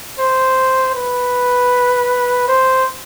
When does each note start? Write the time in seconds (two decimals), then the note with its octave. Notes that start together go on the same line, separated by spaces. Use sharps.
0.19 C5
0.95 B4
2.48 C5